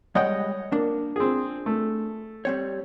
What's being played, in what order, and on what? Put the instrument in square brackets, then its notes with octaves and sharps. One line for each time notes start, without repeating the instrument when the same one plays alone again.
[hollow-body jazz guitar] G3 G#3 G5 [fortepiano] C#5 D#5 F#5
[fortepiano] A#3 [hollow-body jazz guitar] D4
[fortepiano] C4 G#4
A3
[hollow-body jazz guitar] G3 C4 C#5